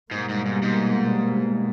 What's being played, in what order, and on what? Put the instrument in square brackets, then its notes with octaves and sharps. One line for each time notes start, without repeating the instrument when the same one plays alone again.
[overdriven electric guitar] G#2 [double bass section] B2 G3 A#3
[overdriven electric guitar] G#2
G#2
G#2